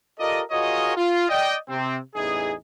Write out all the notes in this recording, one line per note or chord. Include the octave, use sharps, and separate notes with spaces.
F4 G4 A4 A#4 D5 D#5
F4 F#4 G#4 A#4 C#5 D#5
F4
D5 D#5 G5
C3 C4
A1 E2 E3 D#4 G#4